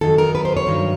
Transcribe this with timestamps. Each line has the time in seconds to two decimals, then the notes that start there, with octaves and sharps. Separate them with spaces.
0.01 F#2 D#3 F#3 A4
0.18 A#4
0.35 B4
0.45 C5
0.57 C#5
0.66 G2 D#3 F#3